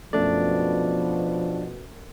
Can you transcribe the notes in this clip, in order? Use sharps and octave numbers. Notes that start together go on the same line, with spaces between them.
F#2 B2 F3 A3 D4 D5